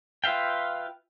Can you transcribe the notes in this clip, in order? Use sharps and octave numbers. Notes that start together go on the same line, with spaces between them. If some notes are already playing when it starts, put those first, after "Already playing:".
F4 B4 E5 F5 G5